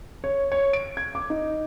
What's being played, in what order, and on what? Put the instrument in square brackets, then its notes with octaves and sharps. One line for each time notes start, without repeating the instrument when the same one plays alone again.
[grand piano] C#5
C#5
D7
G#6
D6
D#4